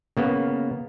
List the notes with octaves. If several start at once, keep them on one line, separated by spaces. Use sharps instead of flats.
C#3 A#3 B3